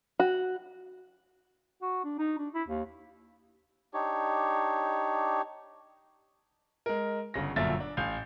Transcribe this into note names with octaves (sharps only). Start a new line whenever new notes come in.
F#4
F#4
D4
D#4
D4
E4
D#2
D4 D#4 G4 C#5
G#3 A#4
G1 C#3 A#6
G1 F#2 A#2 F4 E5 A6
D4
A1 F5 G#5 G6